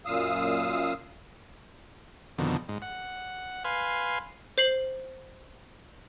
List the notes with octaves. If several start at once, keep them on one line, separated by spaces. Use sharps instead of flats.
F#2 A#2 F5 D#6 E6
F2 B2 D3 D#3
G#2
F#5
B4 F5 G#5 C6
C5 C7 F#7